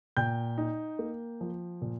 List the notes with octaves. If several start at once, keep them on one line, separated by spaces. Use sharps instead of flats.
A#2 G5 G6
D#4
A#3
F3
A#2